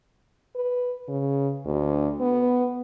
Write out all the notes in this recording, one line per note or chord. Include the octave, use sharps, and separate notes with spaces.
B4
C#3
D2
B3